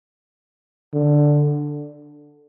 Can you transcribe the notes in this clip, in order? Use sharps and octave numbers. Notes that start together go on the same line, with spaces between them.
D3